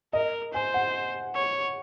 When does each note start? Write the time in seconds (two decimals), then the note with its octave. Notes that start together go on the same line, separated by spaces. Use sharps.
0.13 A#4 D#5
0.54 C5 G#5
0.74 F#5
1.35 C#5